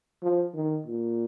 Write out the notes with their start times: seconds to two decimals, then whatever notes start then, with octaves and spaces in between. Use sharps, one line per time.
0.23 F3
0.54 D#3
0.87 A#2